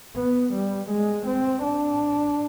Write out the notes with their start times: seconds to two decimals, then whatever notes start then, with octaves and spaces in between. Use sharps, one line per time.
0.16 B3
0.54 G3
0.90 G#3
1.26 C4
1.63 D4